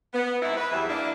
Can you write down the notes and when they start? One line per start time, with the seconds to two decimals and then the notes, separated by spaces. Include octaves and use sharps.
0.14 B3
0.42 G#2 C4 D#4 E4
0.57 B4
0.71 E2 E3 F#3 G3 G#4 E5
0.89 A#3 D4 E4